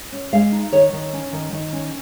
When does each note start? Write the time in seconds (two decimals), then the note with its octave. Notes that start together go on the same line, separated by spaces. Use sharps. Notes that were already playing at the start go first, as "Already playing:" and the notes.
0.12 C#4
0.33 G#3 F5
0.52 D#4
0.72 D#3 C#5
0.93 D#3
1.13 C#4
1.33 D#3
1.53 D#3
1.73 C#4